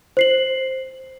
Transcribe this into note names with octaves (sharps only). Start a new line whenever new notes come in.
C5 C7 F#7